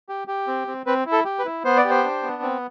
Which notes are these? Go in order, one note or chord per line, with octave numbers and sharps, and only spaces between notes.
G4
G4
C4
C4
C4 B4
E4
A4
G4
B4
E4
B3 C5
D5
G4
C5
D4
B3
C4